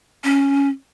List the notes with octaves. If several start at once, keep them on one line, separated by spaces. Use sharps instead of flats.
C#4